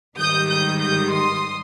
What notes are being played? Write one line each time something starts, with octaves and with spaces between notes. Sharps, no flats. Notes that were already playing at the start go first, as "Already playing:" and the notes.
G#2 D#3 G3 D#6 G6
D#6 G6
D#6 G6
C6 D#6